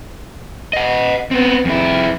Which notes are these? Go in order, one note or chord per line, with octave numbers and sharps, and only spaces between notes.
D#5 F#5
B3 C4
F2 E4